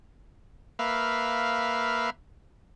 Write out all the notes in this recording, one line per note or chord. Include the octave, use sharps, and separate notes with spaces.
A#3 B4 E5 F5